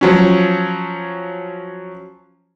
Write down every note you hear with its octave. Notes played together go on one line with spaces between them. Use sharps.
F3 F#3 C#4